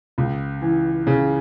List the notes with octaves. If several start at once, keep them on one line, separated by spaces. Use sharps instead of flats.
C#2
E3
C#3